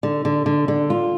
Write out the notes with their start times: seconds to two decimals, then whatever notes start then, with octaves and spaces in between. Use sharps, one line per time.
0.03 D3
0.25 D3
0.46 D3
0.68 D3
0.90 F4